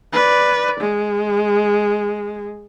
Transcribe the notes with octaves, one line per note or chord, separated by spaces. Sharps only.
B4 D5
G#3